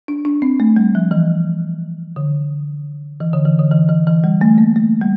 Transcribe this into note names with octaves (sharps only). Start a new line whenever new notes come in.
D4
D4
C4
A3
G3
F3
E3
D3
E3
D3
E3
D3
E3
E3
E3
G3
A3
A#3
A3
G3